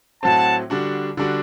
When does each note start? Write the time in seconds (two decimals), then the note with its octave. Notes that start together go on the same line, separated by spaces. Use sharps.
0.22 A2 F#3 C4 F#5 A5
0.70 D3 G3 D4 F#4
1.17 D3 G3 D4 F#4